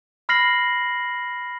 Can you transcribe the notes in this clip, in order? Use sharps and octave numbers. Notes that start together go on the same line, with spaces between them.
B5 F6 A#6 C7 F#7